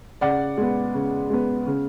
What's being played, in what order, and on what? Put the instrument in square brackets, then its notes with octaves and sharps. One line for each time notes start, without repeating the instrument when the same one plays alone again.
[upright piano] C#3 D5 F#5
G#3 B3
C#3
G#3 B3
C#3